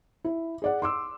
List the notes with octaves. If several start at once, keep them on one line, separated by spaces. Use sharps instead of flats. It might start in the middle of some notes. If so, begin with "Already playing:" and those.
E4
G#4 D5 F#5
C6 D6 E6